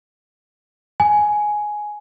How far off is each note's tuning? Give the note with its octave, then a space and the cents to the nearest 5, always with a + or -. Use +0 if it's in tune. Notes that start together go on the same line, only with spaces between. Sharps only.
G#5 +10